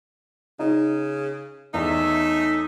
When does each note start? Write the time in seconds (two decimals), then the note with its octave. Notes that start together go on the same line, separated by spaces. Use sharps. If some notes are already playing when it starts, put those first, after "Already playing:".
0.59 C#3 D#4
1.74 E2 A3 C#4 D#4 E5